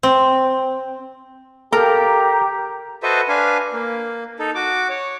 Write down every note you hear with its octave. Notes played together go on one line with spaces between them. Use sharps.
C4
G4 A4 A#4 F5 A#5
F#4 A4 B4 C5 D#5 E5
D4 B4 F5 G#5
A#3
D#4 A4
F#4 D6
C#5